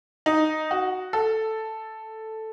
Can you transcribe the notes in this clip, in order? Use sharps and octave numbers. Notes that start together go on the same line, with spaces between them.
D#4
F#4
A4